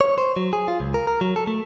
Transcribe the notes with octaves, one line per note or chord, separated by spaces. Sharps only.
C#5
C5
F#3
G#4
F4
C#2
A#4
A#4
F#3
A4
A3